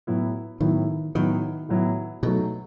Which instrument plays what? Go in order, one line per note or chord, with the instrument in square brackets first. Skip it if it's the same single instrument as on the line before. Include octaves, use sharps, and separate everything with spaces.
[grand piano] A2 F#3 B3 E4
[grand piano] A2 F#3 B3 E4 [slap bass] D#3
[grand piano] A2 F#3 B3 E4 [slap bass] D#3
[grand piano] A2 F#3 B3 E4
[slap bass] B2 [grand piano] F#3 A3 D#4